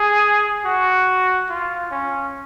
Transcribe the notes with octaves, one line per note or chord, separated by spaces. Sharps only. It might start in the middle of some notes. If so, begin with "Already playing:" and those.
Already playing: G#4
F#4
F4
C#4